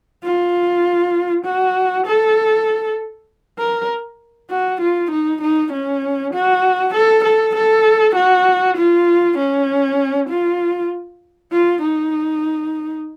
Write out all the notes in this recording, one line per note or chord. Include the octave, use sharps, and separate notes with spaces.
F4
F#4
A4
A#4
F#4
F4
D#4
D#4
C#4
F#4
A4
A4
A4
F#4
F4
C#4
F4
F4
D#4